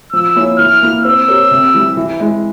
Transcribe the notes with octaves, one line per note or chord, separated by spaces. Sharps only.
F3 E6
A#3 E4 G#4 C#5
E3 F6
A#3 E4
C4 E6
G4 A#4 C#5
C3
E3 G3
E3
G#3 E4